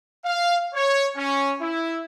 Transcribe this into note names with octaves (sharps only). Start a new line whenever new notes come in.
F5
C#5
C#4
E4